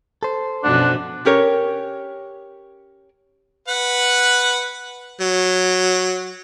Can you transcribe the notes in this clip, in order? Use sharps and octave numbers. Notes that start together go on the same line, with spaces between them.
A4 C5
F#2 B2 F3 D4 F#5
C#4 G4 A#4 C#5
B4 F#5
F#3